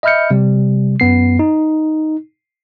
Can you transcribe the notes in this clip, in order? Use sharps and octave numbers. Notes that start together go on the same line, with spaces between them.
D#5 E5 B5 F6 G6 C#7
C3 G3
F#2 B3 C7
D#4